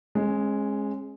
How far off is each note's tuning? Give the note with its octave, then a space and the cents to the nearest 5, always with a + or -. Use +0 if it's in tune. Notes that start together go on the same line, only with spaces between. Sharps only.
G#3 +0 C#4 -35